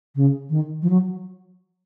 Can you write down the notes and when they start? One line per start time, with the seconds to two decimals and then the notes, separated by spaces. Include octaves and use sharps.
0.16 C#3
0.50 D#3
0.82 F3
0.90 F#3